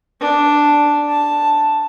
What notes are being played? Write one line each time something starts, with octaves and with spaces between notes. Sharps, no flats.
D4
A5